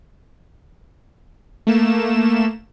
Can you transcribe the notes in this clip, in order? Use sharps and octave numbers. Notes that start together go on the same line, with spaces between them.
A3 A#3 E7